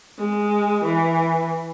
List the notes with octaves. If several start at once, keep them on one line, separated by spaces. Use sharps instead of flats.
G#3
E3